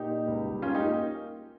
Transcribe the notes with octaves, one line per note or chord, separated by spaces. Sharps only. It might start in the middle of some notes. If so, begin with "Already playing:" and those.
Already playing: A#2 D#4 G4
A#3
C#2
G3
G#2 C#4 F4
D#4 G4
A#3